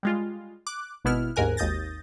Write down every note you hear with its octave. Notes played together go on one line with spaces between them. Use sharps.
G3 G#3 F4
D6 F#6
G#1 B2 B3 E4 F6
G1 D#2 G#2 A#4 G#5 F#6
G#1 D#2 D#6 G6 A6 A#6